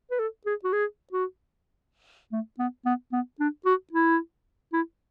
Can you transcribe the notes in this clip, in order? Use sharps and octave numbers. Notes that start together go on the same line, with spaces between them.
B4
A4
G#4
F#4
G#4
F#4
A3
B3
B3
B3
D4
F#4
E4
E4